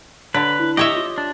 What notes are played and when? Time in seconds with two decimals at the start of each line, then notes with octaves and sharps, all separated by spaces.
0.34 D3 B4 C#5 A#5
0.59 E4
0.77 G4 C#5 D#5 E5
0.96 F4
1.18 D4